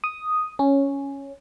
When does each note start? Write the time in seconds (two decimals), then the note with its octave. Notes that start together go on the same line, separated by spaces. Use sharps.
0.04 D#6
0.59 C#4